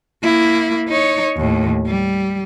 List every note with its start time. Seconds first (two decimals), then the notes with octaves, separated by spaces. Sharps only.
0.23 A#3 E4
0.89 D#4 C#5
1.37 D#2 A2
1.87 G3